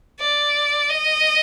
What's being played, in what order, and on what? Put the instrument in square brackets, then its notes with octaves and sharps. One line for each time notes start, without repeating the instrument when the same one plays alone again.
[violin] D5
D#5